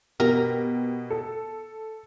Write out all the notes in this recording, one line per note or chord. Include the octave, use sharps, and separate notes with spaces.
B2 G4 A#4
A4